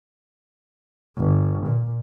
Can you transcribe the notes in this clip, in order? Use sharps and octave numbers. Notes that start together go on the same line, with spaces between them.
G1
A#2